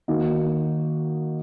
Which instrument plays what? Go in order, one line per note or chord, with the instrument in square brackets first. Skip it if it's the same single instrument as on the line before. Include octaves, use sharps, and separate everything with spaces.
[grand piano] D#3 A#3 D#4 F#4